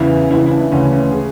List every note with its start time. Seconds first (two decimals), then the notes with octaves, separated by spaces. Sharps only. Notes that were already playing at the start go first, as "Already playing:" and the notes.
Already playing: E2 C#3 E3 E4
0.31 C#2 C#3 E3 E4
0.46 E4
0.51 D4
0.72 D2 C#3 E3 C#4
0.92 C#4
1.12 G#4